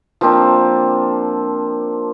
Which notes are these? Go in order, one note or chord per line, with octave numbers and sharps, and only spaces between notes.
F3 A#3 C4 D4